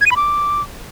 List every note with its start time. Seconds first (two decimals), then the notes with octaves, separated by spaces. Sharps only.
0.01 G#6
0.06 D#7
0.11 B5
0.16 D6